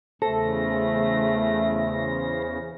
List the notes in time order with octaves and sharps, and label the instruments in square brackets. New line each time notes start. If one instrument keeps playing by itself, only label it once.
[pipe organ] E2 C#3 [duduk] A3 [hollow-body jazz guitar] A4 [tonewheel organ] C5 A#6